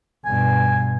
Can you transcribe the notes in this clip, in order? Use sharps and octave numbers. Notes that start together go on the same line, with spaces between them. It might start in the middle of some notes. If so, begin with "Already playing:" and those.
G2 B2 G#5